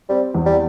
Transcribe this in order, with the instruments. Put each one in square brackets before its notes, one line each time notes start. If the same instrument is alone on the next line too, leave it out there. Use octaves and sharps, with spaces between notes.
[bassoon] G3 [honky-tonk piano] C4
[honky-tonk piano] E2
[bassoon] G3